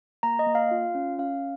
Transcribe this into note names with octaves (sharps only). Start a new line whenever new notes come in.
A#3 A#5
D#5
A#3
F5
F4
C#4
C#4 F5